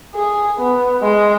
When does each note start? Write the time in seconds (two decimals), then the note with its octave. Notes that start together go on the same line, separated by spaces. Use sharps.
0.15 G#4
0.59 B3
1.02 G#3